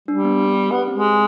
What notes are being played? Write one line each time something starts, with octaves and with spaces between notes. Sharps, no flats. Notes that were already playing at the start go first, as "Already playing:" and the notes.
G3 D4
B3
B3
G4
B3 G4
C4
G#3
C4